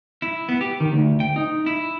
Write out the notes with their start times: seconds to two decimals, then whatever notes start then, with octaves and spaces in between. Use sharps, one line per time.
0.22 E4
0.49 B3
0.61 G4
0.80 D#3
0.93 D2
1.20 G5
1.36 D#4
1.66 E4